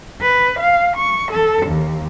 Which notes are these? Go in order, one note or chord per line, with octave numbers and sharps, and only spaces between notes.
B4
F5
C#6
A4
D#2